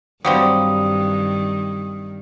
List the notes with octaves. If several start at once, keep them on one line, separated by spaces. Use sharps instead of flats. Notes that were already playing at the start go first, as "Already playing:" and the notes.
G2 D#3 F#3 G3 C4 F5 G5 D#6